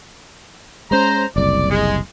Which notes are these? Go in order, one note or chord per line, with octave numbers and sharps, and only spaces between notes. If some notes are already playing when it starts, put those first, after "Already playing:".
G#3 C#4 C5 A#5
F#1 C2 D5
G#3